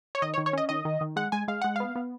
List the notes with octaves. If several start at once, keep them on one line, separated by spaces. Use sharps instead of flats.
C#5
D#3 D#5
C#5
D#3
C#5
C#4 D#5
D#3 D#5
D#3
D#3
G#3 F#5
G#3 G#5
G#3 F5
G#3 F#5
B3 F5
B3